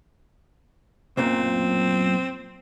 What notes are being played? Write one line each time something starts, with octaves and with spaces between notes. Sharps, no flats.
B1 F#2 A#2 C4